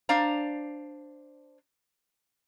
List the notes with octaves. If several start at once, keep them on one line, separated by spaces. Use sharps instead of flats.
D4 C5 F5 A#5